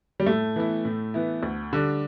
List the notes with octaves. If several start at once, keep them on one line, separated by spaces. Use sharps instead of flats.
G3
A2 A3
E3 B3 E4
A2
E3 B3 E4
D2
D3 G3 D4